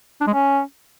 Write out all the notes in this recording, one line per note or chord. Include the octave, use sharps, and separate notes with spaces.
D4
G#3
C#4